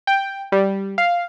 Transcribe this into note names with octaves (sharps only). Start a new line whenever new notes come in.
G5
G3
F5